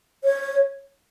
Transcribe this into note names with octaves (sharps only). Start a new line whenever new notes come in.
C#5